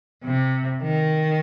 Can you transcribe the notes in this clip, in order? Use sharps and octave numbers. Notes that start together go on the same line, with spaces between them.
C3
D#3